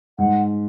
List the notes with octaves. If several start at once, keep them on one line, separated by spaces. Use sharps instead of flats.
G#2 F#5